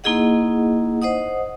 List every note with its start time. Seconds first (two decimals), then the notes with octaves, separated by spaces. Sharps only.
0.04 A#3 D#4 E4 G#4 D#5 F#5
1.02 C5 D#5 F#5 D#6